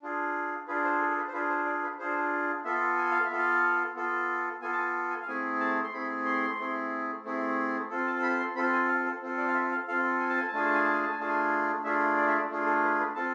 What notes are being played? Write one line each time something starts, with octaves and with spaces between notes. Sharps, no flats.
D4 F4 G#4
D4 F4 G#4 B4
C5
A4
A4
B4
C5
D4 F4 G#4 B4
C5
D5
B4
D4 F4 G#4 C5
B3 F4 A4 E5
G#5
F5
E5
B3 F4 A4
F5
B3 F4 A4
B3 F4 A4 G#5
A5
G#5
G#5
F5
A3 C4 E4 G#4 G#5
A5
C6
A3 C4 E4 G#4 B5
C6
A3 C4 E4 G#4
A3 C4 E4 G#4
C4 F4 A4
A5
B5
C6
C4 F4 A4 B5
G#5
F5
A4
C4 F4 A4
D5
F5
E5
F5
C4 F4 A4 F5
G#5
A5
G#5
A5
A3 D4 F4 G#4 G#5
A5
G#5
A5
G#5
A5
G#5
A3 D4 F4 G#4 A5
G#5
A3 D4 F4 G#4 E5
D5
E5
D5
A3 D4 F4 G#4
A4
B4
B4
C4 F4 A4 A5